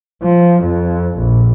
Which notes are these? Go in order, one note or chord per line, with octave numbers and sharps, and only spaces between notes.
F3
F2
A#1